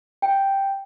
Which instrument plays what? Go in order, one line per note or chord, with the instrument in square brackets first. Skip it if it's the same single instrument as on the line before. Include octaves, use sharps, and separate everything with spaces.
[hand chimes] G5